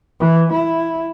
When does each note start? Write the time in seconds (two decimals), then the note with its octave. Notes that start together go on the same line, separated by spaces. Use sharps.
0.20 E3
0.52 E4